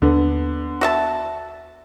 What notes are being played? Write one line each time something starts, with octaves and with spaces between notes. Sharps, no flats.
D#2 D3 B3 D4
F#4 E5 A5